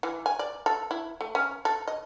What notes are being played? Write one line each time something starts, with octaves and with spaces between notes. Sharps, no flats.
E3
G#5
D5
A4
E4
A3
C#4
A4
D#5